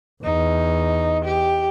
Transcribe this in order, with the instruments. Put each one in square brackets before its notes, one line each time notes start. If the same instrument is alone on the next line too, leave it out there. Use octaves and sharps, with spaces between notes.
[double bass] E2 [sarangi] D#4
[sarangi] G4